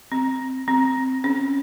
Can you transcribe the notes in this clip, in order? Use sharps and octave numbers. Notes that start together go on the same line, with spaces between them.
C4
C4
C#4